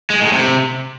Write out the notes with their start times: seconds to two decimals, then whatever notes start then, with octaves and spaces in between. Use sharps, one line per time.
0.10 G#3
0.21 A2
0.33 C3